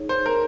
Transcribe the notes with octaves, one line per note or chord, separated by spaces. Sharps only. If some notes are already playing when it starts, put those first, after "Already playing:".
Already playing: D#4 G#4 C#5
C5
A#4